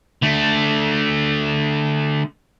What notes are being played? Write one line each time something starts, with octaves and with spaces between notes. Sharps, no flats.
D3 A3